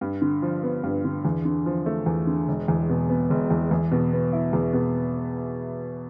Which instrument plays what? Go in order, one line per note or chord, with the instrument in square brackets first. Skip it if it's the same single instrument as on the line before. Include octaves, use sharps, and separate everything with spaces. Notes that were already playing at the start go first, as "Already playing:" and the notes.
[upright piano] G2
D3
F3
B3
G2
D3
E2
D3
F3
A3
E2
D3
E1
E2
B2
B3
E1
E2
E2
B2
B3
E4
E2
B2